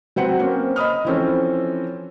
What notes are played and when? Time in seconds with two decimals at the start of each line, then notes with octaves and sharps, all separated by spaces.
0.16 F#3 C4 B4 F#5 C#7
0.39 A#3 C4 C#4
0.76 D#5 B5 D#6 F6
1.05 E3 F3 C4 C#4 A4